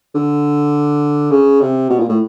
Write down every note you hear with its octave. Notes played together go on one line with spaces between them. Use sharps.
D3
C#3
C3
B2
A#2
A2